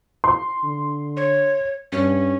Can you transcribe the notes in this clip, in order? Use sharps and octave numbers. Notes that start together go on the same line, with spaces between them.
C6
D3
C#5
G2 C#4